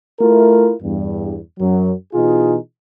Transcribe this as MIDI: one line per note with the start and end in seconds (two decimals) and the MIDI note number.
0.20 0.73 57
0.20 0.73 64
0.20 0.73 65
0.20 0.73 70
0.82 1.38 40
0.82 1.38 43
1.59 1.92 42
1.59 1.92 54
2.13 2.56 47
2.13 2.56 52
2.13 2.56 63
2.13 2.56 65
2.13 2.56 68